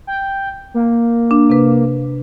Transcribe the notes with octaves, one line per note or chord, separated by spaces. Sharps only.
G5
A#3
D4
C3 B4